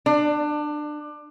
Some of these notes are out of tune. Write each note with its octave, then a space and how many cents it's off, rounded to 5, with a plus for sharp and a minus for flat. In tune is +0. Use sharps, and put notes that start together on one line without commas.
D4 +25